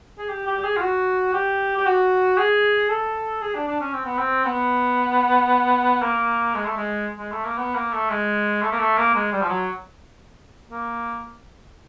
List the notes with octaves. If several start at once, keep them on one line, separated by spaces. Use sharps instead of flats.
G#4
G4
G4
G4
G#4
F4
F#4
G4
G4
F#4
G#4
A4
G#4
D4
D4
C#4
C4
B3
C4
B3
A#3
G#3
A3
G#3
G#3
A3
A#3
B3
A#3
A3
G#3
A3
A#3
A3
A#3
G#3
G3
F3
F#3
A#3